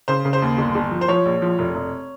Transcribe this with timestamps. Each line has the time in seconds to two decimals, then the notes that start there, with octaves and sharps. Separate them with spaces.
0.08 C#3 C5
0.25 C#3
0.33 C5
0.42 D#2
0.58 G1
0.75 G1
0.91 F3
1.01 C5
1.08 F3 C#5
1.26 A#1
1.42 F3
1.59 F1
1.75 F1